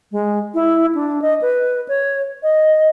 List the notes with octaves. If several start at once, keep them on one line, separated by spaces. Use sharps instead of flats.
G#3
E4
D4
D#5
B4
C#5
D#5